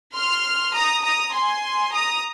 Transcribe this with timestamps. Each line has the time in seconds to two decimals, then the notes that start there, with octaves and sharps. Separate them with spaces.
0.15 C6 F6
0.74 A#5 D#6
1.03 A#5 D#6
1.33 G#5 C6
1.92 A#5 D#6